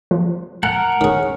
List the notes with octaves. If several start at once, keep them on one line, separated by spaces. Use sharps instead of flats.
F3
A#4 F#5 A5
D#3 C#4 G#4